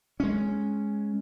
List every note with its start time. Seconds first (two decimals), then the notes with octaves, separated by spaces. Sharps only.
0.20 G#3 C#4